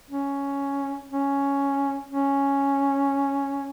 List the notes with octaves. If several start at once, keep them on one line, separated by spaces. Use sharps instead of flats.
C#4
C#4
C#4